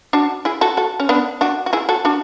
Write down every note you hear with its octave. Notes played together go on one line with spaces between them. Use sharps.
D4 F#4
E4 G#4
F#4 A4
F#4 A4
C#4
B3 D4
D4 F#4
F#4
E4 G#4
F#4 A4
D4 F#4